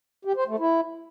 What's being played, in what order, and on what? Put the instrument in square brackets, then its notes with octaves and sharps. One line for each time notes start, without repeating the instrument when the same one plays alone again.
[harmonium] G4
C5
A3
E4